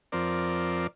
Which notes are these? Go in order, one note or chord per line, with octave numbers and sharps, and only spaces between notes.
F2 F3 C4 A#4 D5